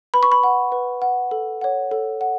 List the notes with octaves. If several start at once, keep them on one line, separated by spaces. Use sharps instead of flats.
B4 B5
C#6
B5
F#5
B4
F#5
A4
C#5 F#5
A4
F#5